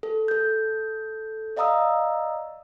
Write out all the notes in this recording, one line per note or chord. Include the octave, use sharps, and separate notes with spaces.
A4
A4 G6
D5 D#5 F5 A#5 D#6 E6